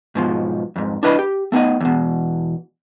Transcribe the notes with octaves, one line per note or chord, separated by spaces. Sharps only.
G#2 B2 F3
F2 G#2
D4 E4 B4 D#5 G#5 B5
G4
A3 B3 D#4 D#5
E2 B2